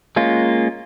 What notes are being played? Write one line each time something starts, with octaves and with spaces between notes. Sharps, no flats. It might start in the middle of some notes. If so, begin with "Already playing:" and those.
G#3 A#3 C#4 F4